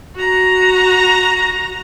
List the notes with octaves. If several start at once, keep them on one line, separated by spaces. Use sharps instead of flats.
F#4 A#5